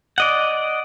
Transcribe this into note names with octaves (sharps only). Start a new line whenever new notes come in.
D5 D#5 F#5